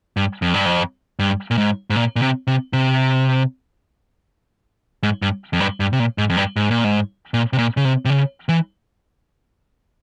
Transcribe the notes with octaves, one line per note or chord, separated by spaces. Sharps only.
G2
F2
G2
F2
G2
A#2
G#2
G#2
A#2
A#2
C3
C3
C3
G#2
G2
F2
G2
G2
C3
A#2
G#2
F2
G2
G#2
A#2
G#2
A#2
C3
A#2
C#3
C3
C3
C#3
E3